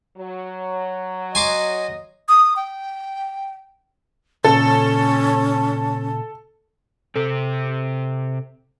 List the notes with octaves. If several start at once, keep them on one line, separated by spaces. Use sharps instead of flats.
F#3
D#5 G#5 C6 D6
D#6
G5
A#2 C#3 C#4 A4
C3 C4 A4